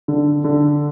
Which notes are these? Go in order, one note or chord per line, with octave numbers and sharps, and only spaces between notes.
D3
D3